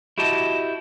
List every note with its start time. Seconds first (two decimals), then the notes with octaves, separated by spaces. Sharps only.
0.18 E4 F#4 G4 D#5 A5